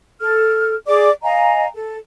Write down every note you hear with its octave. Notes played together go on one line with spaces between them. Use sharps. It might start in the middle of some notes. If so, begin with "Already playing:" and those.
A4 F6
G#4 D5 D6
D#5 F5 G#5 A#5
A4